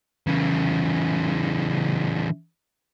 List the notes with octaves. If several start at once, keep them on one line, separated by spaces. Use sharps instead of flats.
C#3 E3